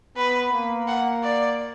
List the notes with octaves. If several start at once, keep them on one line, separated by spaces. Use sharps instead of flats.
B3 B4
A#3
F#5
D5